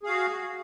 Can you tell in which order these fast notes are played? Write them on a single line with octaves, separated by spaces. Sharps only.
G#4 F5 F#4